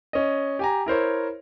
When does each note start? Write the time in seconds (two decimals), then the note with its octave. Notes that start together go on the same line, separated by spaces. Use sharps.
0.13 C#4 D#5
0.59 G4 G#5 A#5
0.86 E4 A#4 C5 C#5